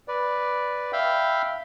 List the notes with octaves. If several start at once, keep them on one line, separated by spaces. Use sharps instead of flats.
B4 D5
E5 F5 G5 B5